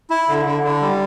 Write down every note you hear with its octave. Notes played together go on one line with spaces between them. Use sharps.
E4
D3
D3
D3
G3